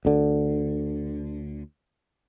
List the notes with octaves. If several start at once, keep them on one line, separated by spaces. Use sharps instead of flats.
D2 D3